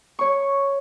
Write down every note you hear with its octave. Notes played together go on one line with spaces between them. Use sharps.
C#5 C#6